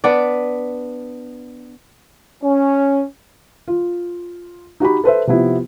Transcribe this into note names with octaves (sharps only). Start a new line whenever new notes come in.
B3 D4 D5
C#4
F4
D#4 F#4 G4 B5
A4 B4 C5 E5
C3 F3 B3 E4